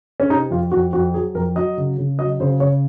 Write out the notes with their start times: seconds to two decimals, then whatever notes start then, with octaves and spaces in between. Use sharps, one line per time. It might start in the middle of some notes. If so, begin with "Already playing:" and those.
0.20 C#4
0.30 C3 D#4
0.51 F2 F4
0.72 F2 F#4
0.93 F2 F#4
1.14 F#3 G#4
1.35 F2 A#4
1.56 F#3 D#5
1.77 C#3
1.98 C#3
2.19 F#3 D#5
2.40 C#3 C5
2.60 C#3 C#5